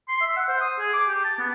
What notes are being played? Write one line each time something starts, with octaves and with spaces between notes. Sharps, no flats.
C6
E5
F#5
C5
D#6
G#4
D6
G4
A5
B3